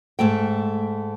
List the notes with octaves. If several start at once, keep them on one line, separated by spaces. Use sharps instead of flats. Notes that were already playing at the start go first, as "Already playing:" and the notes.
G#2 A3 G5